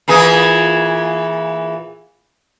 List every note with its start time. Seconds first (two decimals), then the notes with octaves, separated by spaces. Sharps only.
0.08 A#2 E3 G#4